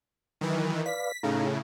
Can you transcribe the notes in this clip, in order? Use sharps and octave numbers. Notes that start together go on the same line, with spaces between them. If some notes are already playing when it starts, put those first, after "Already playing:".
D#3 E3 F#3
B4 D5 F5 B6
A2 C#3 D#4 F5 A#5